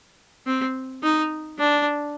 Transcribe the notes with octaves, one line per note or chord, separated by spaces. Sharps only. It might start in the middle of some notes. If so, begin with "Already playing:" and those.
C4
D#4
D4